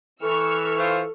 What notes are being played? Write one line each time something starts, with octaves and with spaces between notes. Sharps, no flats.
E3 A4 C#6 E6 F6
F4 C5